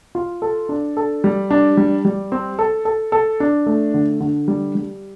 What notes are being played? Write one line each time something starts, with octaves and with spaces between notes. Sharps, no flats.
F4
A4
D4
A4
G3
D4
G3
G3
C4
A4
A4
A4
D4
A3
D3
D3
G3
G3